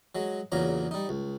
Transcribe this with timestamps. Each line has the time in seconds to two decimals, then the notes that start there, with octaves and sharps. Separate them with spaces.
0.15 F#3 G#3
0.52 E2 A#2 C#3 F#3 A#5
0.91 G3 D#4
1.09 C#2